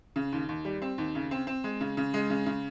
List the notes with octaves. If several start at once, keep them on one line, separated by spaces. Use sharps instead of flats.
C#3
D#2
D#2
G3
C4
D#2
C#3
C4
C4
G#3
C#3
C#3
G#3
C#3
C#3